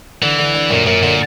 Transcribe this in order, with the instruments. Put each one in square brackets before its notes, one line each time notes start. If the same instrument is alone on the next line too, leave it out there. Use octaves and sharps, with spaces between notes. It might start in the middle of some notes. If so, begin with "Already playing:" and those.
[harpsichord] D3 [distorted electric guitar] E3
[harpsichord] D3
D3
[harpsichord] F#2 [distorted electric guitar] A#2
[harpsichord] F#2 [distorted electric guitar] A#2
[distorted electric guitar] A#2 [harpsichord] D3